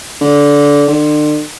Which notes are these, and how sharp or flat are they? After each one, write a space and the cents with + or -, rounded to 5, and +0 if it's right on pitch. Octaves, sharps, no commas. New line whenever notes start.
D3 -20
D3 +35